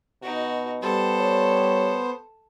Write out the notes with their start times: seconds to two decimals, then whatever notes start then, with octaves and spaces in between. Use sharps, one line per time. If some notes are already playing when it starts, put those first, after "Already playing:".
0.23 B2 D#4 F#4
0.82 G3 B3 A4 C5
1.19 C#5